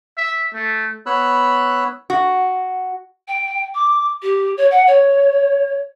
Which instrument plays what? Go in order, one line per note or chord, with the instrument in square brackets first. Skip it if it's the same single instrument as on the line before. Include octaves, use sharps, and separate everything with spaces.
[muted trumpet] E5
A3
[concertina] B3 C#5 B5 E6 F#6
[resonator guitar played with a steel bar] F#4
[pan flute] G5
D6
G4
C#5
F#5
C#5